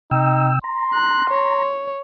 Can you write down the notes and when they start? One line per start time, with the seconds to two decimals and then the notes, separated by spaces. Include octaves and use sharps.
0.11 C3 D#4 G5 E6
0.64 A#5 C6
0.94 F#6
1.30 C#5